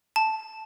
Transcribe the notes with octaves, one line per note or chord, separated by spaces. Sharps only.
A5